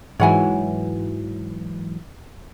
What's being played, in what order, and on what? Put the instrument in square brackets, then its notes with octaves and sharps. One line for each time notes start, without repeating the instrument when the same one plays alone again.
[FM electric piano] G#2 E3 F#3 [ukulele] C#5 F#5 G#5